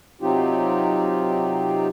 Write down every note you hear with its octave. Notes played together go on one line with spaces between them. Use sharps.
C3 F#3 C4 D#4 F4 G4